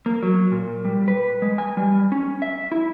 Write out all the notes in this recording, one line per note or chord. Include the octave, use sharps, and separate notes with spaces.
A#3
F#3
A#2
G3
B4
G#3
G#5
G3
C#4
E5
E4